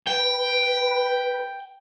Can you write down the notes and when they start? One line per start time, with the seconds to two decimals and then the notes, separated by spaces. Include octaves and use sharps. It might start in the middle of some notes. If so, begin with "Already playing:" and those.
0.07 B4 G5